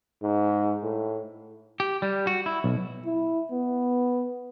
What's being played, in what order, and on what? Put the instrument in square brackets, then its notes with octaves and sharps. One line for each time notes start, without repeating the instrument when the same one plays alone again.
[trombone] G#2
A2
[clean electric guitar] G4
G3
F#4
E4
B1
[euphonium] E4
B3